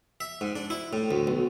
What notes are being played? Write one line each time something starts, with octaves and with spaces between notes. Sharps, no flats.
E5
G#2
D4
E4
A2
D2
B1